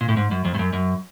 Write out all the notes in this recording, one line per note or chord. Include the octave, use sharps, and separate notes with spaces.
A#2
A2
G#2
F#2
F2
G2
F#2
F#2